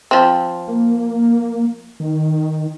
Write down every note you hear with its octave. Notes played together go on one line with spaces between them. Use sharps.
F3 C4
A#3
D#3